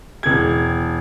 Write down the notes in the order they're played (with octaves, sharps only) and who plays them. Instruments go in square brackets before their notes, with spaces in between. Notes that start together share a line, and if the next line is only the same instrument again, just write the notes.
[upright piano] E1 G#6